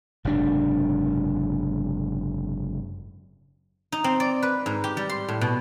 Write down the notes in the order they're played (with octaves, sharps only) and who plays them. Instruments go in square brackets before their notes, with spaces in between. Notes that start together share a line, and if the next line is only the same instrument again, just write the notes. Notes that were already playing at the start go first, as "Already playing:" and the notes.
[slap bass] F#1 G#2 C3 D4
[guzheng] D#4
C4
D5
B4
G#2
G4
G3
C6
A2
B2